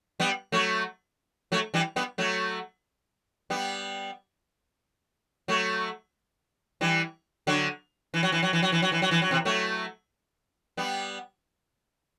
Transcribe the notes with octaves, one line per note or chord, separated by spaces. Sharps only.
G3 B3
F#3 A3
F#3 A3
E3 G3
G3 B3
F#3 A3
G3 B3
F#3 A3
E3 G3
D3 F#3
E3
F#3
E3
F#3
E3
F#3
E3
F#3
E3
F#3
E3
F#3
C3 E3
F#3 A3
G3 B3